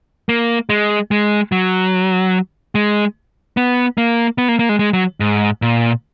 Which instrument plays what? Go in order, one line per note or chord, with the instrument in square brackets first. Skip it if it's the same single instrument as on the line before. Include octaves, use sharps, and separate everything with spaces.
[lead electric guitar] A#3
G#3
G#3
F#3
G#3
B3
A#3
B3
A#3
A#3
G#3
G#3
F#3
G#2
A#2